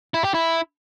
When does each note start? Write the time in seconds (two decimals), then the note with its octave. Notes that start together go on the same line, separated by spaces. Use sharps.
0.14 E4
0.24 G4
0.34 E4